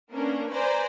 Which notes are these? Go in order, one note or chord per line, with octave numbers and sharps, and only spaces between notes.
A#3 B3 C#4 D4 A#4
B4 C5 D5 G#5 A#5